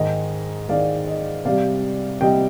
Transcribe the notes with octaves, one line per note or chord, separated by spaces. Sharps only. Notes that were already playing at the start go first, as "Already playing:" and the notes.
Already playing: G#2 D#3 G#3 D#5
G#2 D#3 G#3 D5 F5
D#5
C3 G3 D5 F5
C3 G3 D#5 G5